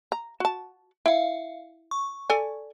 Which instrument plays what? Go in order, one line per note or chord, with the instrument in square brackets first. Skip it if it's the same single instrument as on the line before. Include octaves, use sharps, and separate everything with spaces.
[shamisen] A#5
F#4 A5
[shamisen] E4 [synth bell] E5 F5
[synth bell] C#6
[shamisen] A4 D5 G#5